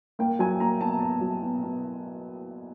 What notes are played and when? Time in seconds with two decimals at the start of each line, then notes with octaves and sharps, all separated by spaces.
0.19 A#3 G5
0.39 F#3 G#5
0.60 A#3 A#5
0.80 B2 A5
1.00 B2 A5
1.21 F#3
1.42 B2
1.63 B2